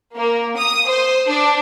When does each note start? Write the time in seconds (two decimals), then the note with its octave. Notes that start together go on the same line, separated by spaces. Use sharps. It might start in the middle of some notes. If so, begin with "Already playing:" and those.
0.15 A#3
0.57 D#6
0.89 C5
1.28 D4